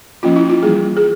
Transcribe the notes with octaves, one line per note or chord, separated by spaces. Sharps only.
F3 A#3 C#4 F4
E4
F4
E3 G3 A#3 G#4
G#4